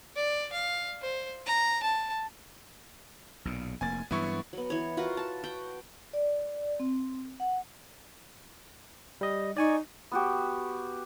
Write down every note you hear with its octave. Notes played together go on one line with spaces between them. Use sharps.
D5
F5
C5
A#5
A5
B1 A#2
F1 A#3 G#5 A6
G2 E3 F#3 B3 E4 C#6
F#3 B3
E3 C#5
F4 F#4 A#4 B4
A5
F#4 G5
D5
C4
F#5
G3 D#5
D#4 D5 G#5 C#6
B3 F#4 G4